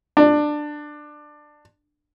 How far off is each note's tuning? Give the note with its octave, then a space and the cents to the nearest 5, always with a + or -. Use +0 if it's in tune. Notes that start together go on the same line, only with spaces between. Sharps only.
D4 +15